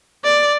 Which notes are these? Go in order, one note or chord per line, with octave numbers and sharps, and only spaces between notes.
D5